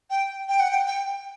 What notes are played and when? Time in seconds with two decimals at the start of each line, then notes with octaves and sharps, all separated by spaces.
0.10 G5
0.48 G5
0.60 F#5
0.71 G5
0.87 G5